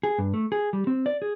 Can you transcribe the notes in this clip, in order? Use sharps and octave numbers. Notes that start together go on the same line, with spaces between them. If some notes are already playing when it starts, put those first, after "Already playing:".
G#4
G2
A3
G#4
G3
C4
D5
G#4